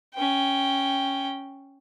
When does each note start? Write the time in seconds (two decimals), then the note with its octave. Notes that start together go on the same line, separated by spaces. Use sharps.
0.15 C#4 G5